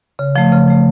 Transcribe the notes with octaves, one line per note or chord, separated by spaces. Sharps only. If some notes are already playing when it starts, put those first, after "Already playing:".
C#3
F3 A3
C#3
F3 A3